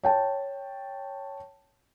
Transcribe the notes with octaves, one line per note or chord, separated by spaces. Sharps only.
C#5 G5 A5